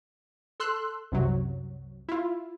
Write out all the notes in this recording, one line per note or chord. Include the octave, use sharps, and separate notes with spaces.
A4 C6 E6 F#6
C2 F#2 C3 F#3
E4 F4